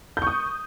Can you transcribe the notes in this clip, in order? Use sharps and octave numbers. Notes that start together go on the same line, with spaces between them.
C#6 D#6 G6